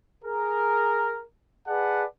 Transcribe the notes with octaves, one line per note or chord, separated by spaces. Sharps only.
G#4 A#4
G#4 B4 D5 F#5 A5